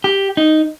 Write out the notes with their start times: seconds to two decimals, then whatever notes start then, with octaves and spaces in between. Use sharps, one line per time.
0.04 G4
0.37 D#4